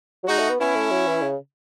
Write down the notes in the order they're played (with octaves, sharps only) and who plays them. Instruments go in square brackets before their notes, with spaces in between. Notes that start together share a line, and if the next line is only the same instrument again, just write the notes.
[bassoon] F#3
[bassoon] G#3 [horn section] D#4 F#4
[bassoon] A3
B3
[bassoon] B3 [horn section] C#4 E4
[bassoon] A3
F#3
E3
C#3